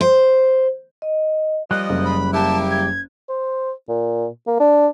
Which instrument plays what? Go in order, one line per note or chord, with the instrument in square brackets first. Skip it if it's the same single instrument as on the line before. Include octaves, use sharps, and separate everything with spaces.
[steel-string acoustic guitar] C5
[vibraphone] D#5
[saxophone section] F3 D#5 [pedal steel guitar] G3 [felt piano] F#6
[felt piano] F#1
[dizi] B5
[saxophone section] A#3 E4 G4 [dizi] A5
[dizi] G#6
[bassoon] C5
A#2
A#3
D4